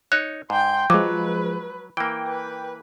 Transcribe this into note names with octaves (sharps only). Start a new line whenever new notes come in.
D#4 C#5 F#6
G#2 G5 C6
F3 F#3 G#3 B4 D6
E3 A#3 G5
B4